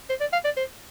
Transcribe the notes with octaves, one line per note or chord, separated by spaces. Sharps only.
C5
D5
F5
D5
C5